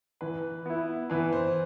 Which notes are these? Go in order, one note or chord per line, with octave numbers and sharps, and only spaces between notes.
E3 B4
B3 E4
E3 B4
C5